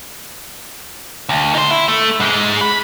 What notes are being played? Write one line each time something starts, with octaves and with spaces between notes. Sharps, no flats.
D2
D#4 C5
E4
A3
G#2 G#3
B5